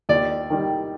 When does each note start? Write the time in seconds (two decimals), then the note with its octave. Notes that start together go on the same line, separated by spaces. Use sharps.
0.09 D#2 D5
0.50 D#3 G3